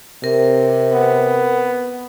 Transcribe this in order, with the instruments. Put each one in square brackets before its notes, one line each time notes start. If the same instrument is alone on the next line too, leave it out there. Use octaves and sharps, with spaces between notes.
[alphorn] C3 [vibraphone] A#4
[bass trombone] B3